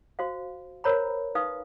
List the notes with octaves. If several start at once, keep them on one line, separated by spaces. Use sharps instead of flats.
F#4 C5 F5
A#4 C5 C#5 A#5 B5
D#4 B4 F5 D#6